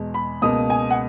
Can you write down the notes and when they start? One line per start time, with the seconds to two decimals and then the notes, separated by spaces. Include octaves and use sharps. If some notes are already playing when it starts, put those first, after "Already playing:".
Already playing: E2 B2 G#3
0.14 B5
0.42 C#2 B2 A#3 D#6
0.70 G#5
0.90 F#5